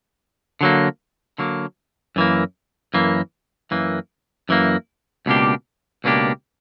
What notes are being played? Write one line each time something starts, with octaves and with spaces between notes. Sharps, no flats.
D3 F#3 A#3
D3 F#3 A#3
F#2 E3 A#3
F#2 E3 A#3
F#2 E3 A#3
F#2 E3 A#3
C#2 B2 A#3 D4 G4
C#2 B2 A#3 D4 G4